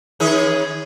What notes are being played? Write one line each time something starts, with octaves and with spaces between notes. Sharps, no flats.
D#3 C#4 G#4